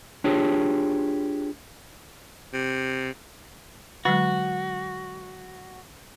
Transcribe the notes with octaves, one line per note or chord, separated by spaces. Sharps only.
D4 F4 G4 G#4 C#5
C3
D3 F#3 G#3 F#4